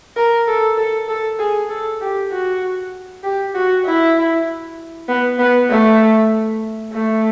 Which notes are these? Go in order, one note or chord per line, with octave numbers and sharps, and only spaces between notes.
A#4
A4
A4
A4
G#4
A4
G4
F#4
G4
F#4
E4
B3
B3
A3
A3